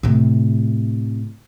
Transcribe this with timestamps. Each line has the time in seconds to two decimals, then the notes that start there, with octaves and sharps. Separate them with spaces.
0.03 A2 C3